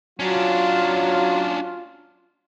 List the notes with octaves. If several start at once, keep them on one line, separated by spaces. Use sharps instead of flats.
F#3 C#4 D4 F4